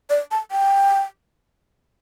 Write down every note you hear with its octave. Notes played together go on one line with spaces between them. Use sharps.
D5
A5
G5